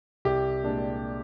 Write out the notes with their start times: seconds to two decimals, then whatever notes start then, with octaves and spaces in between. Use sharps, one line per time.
0.25 C2 G4
0.64 A#2 G#3 D4